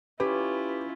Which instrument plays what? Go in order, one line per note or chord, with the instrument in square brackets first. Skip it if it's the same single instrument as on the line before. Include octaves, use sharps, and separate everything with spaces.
[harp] C#4 [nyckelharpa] E4 F4 [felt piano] G4 [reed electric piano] B4